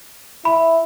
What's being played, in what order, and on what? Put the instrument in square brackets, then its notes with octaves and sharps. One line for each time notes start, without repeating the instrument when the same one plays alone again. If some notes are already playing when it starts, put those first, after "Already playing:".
[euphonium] E4 [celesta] B5